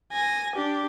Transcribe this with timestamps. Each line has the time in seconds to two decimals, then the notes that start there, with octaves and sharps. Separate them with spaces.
0.12 G#5 A#6
0.56 D4 G4